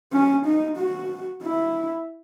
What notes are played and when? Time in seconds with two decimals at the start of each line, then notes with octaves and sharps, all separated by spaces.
0.13 C#4
0.46 D#4
0.77 F#4
1.43 E4